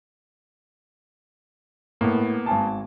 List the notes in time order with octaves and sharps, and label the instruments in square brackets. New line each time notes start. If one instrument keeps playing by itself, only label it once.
[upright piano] A2 [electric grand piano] A#3 B3
[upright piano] G#1 G#5 A5